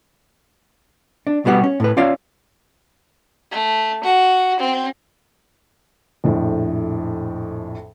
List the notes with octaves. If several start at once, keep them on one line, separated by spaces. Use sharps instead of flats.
D4
B2 G3 B3 F#4 G4
C#4
A2 B4
C#4 F4 C#5 D5 F5
A3
F#4
C4
A#1 F2 A2